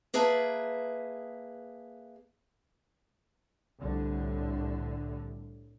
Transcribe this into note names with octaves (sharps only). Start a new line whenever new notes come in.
A#3 G#4 B4 E5 A5
C2 A2 D3